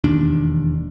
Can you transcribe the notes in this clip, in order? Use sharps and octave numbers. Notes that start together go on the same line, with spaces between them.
E1 D#2 D4